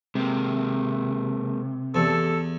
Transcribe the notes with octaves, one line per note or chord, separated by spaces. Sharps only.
C3 G#3 A#3
E2 A3 G4 A4